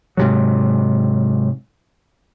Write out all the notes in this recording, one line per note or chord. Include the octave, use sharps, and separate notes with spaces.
G#2 C3 F#3